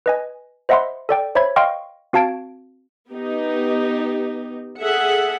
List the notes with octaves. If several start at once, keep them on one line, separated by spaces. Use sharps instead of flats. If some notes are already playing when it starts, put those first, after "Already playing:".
B4 D#5 G#5
C5 D#5 E5 F#5 B5 C6
A4 D5 G5
C5 C#5 E5 B5 G#6
D#5 F5 G5 C6 C#6 F6
C4 F#4 F5 A5 G#6 D7
B3 D#4 G4
G#4 A4 E5 F#5